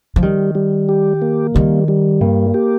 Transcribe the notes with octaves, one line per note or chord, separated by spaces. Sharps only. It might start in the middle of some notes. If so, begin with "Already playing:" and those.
F3
D#3 G3
G3
G4
A#3
D#3 G3
G3
G2 A#3
G4